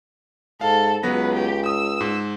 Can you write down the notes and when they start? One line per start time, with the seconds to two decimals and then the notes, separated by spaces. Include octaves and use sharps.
0.61 G#2 A4 F5
1.03 C#2 F#3 B3 B4 A#6
1.35 G4
1.66 D#6 E6
2.01 G#2